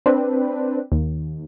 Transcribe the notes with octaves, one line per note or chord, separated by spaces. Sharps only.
C4 D4 B4
D#2